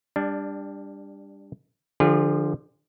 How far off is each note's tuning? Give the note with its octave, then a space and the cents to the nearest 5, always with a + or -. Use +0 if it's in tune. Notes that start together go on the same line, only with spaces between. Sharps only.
G3 +25 D4 +0
D3 +20 F3 +0 G#4 -35